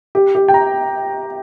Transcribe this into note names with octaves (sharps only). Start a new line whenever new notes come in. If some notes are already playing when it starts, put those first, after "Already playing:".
G4
G4
G5
A#5